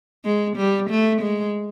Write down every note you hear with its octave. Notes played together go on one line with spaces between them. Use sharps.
G#3
G3
A3
G#3